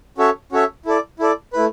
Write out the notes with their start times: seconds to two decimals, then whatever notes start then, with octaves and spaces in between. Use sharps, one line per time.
0.18 C#4 F#4 A4 C#5 E5
0.52 C#4 F#4 A4 C#5 E5
0.85 E4 A4 D5
1.19 E4 A4 D5
1.53 A3 E4 B4